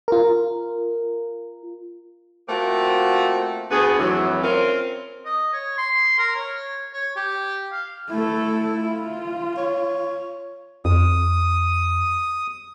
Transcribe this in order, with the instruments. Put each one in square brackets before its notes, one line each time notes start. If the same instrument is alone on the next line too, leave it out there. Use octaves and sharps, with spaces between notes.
[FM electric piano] F4 A#4
[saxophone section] A3 A#3 C4 F4 F#4
D2 B3 G#4
F2 A2 E3 F#3
C4 C#4 F4 A#4
[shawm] D#5
C#5
C6
A#4
C#5
C#5
G4
F5
[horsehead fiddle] A3 A4 [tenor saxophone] E4
[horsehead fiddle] F4
[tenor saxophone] C#5
[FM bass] F2 [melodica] D#6